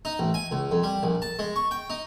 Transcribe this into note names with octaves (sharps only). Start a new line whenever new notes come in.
D#4
A1
G#5
C#2
F2
G3
A#1
A5
G#3
C#6
G5
D#4